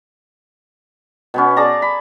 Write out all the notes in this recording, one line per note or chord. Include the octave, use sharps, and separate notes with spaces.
B2 B3 C#4
G#4 D5 A5 A#5
B5